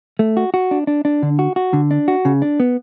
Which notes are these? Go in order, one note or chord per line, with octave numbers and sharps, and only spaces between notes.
A3
F#4
F#4
D4
D4
D4
D3
F#4
F#4
D3
D4
F#4
C#3
D4
B3